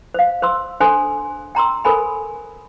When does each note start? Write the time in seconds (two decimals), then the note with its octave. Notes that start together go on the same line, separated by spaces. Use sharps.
0.14 C5 F5
0.42 C5 C6 E6
0.80 D4 A4 C5 G#5 C6
1.55 G5 A#5 C6 E6
1.84 A4 A#4 C5 G#5 B5